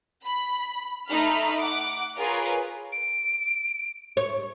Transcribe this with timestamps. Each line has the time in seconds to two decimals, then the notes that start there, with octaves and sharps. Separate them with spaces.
0.24 B5
1.08 A3 D#4 B5 F6
1.58 F#5 D6
2.16 F4 G#4 A#4 B4 C#5
2.92 D7
4.17 C#5